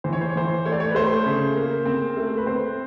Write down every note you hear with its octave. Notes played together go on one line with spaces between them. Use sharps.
E3 C5
C#5
C5
C#5
E3 C5
A3 C#5
D5
C#5
B4
A3 C5
C#3
A#3
C4
A3
B4
C4 C5